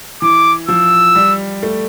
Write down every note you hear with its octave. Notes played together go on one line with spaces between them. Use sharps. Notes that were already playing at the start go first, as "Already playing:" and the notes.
E3 D6
F3 E6
G3
A3